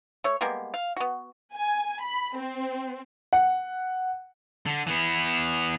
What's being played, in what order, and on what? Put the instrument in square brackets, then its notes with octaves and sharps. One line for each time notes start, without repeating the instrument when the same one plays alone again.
[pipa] A3 C#5
G3 G#3 A#3 B3
F5
B3 F#4
[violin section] G#5
B5
C4
[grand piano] F#5
[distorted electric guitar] D3
E3 B3